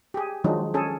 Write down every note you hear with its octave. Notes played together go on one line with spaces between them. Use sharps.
G4 G#4
D#3 F3 F#3 G#3 D4 D#4
C#4 G#4 A4